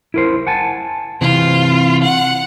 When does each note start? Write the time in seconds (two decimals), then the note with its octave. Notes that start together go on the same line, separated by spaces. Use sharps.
0.14 E4 A#4 C5
0.47 F#5 G#5 A5
1.21 C3 E3 C4 F4
2.03 F#5